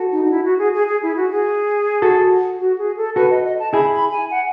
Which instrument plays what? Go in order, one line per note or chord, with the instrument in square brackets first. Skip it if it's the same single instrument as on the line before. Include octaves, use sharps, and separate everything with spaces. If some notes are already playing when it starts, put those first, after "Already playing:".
Already playing: [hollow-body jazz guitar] F#4 A4
[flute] D#4
D#4
E4
F#4
G#4
G#4
G#4
E4
F#4
G#4
[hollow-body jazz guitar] F#4 A4
[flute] F#4
G#4
A4
[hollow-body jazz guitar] F#4 A4 [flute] B4
[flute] D#5
D#5
A5
[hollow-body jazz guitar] E4 G#4 [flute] B5
[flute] B5
G#5
F#5